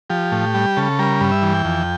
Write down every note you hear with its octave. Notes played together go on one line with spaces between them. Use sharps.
F3 G4
A2
G3
C#3 A4
G3 A#4
G2
E5
E3
G5
F2